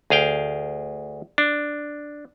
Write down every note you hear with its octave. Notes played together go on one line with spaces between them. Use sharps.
D2 G#4 F5 G5
D4